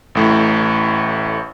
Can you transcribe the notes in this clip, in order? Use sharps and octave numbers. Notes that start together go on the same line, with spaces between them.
A1 A2